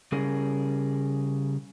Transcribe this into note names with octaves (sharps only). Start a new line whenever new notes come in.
C#3 G3 C#4 G#4 A#4